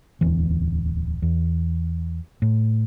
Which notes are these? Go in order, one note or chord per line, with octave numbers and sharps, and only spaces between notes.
D1 E2 E3
E2
A2